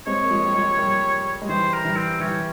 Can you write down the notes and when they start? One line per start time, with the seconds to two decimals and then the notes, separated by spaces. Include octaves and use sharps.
0.07 G#3 C4 C#5
0.24 A#3
0.30 F3 G#3
0.44 G3
0.54 F3 G#3
0.78 G3 A#3
1.42 G#3
1.49 E3 G3 C5
1.73 A#4
1.85 E3 G3
1.97 C4
2.20 E3 G3 C#4